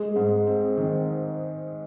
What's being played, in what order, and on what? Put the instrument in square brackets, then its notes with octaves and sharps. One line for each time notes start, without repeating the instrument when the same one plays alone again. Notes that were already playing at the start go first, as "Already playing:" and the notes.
Already playing: [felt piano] G#3 [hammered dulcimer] G#4
[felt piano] G#2
C4
D#3